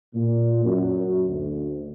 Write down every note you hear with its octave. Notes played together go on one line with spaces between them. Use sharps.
A#2
F#2
D2